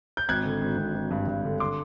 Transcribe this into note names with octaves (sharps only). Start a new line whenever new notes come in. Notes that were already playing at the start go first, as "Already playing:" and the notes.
G6
G#1 F#6 G#6
D3
G#1
G#1
G#1
G2
G2
D3
C6 D6